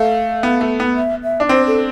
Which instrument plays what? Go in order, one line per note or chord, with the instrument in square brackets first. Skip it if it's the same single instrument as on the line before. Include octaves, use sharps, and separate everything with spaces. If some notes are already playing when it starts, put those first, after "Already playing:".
Already playing: [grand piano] A3 [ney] F5
[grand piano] B3
A3
B3
[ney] E5
E5
[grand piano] D4
[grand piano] C4 [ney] C5
[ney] A4